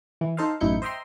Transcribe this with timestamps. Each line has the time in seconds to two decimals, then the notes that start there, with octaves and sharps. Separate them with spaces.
0.21 E3
0.37 D#4 A4 C5 D#5 F5
0.60 A1 F#2 D#4 E4 G6 C#7
0.82 C5 D#5 E5 G5 A#5 C6